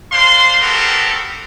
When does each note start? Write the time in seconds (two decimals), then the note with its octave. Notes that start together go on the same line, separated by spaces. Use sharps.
0.12 D4 C5 F5 C6
0.62 B3 C4 F#4 G4 A4 A#4